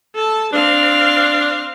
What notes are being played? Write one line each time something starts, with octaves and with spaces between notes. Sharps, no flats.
A4 A5
C4 D4 F5